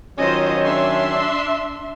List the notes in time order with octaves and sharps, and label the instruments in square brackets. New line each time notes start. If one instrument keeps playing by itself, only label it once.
[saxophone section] D#3 F#3 C#4 [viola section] F4 C5 D#5
[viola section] D4 E5 C6